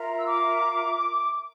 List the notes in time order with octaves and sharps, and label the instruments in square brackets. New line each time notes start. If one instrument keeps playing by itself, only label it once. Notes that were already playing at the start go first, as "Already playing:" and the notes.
Already playing: [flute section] F4 A#4 E5 A#5
[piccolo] E6
D6